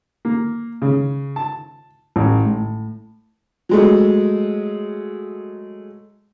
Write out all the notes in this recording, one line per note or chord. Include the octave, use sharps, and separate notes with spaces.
A#3
C#3
A5
A1
A2
F#3 G#3 A3